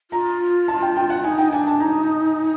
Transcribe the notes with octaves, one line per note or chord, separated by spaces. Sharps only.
F4 A#5
A5
G5
G5
F#5
D#4 G#5
G5
D4 G#5
A5
D#4 A#5